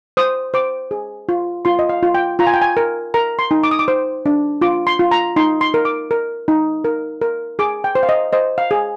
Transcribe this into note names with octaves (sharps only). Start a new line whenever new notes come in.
C5 D#6
C5 D6
G#4
F4
F4 C6
D#5
F5
F4
G5
F4 A#5
G#5
G5
G#5
A#4
A#4 A#5
C6
D#4
D6
D#6
D6
C5
D4
F4 D6
C6
F4
A#5
D#4 C6
C6
A#4
D6
A#4
D#4
A#4
A#4
G#4 D6
G5
C5
F5
D#5
C5 D#5
F5
G#4